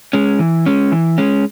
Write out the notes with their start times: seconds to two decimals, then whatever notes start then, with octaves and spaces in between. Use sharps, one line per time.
0.13 G#3 C#4
0.39 E3
0.66 G#3 C#4
0.92 E3
1.18 G#3 C#4